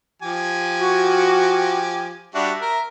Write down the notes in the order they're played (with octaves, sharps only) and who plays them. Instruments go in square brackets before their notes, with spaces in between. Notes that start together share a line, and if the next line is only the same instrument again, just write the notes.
[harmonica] F3 G4 G#5
[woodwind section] F#4
[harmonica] G3 D4 F#4 [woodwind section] E5
[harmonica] A#4